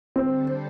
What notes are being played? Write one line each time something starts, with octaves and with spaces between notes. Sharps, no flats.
D3 G3 C4 D4 A4 C5